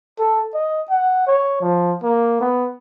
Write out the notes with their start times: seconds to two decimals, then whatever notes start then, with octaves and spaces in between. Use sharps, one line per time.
0.19 A4
0.54 D#5
0.90 F#5
1.27 C#5
1.61 F3
2.03 A#3
2.41 B3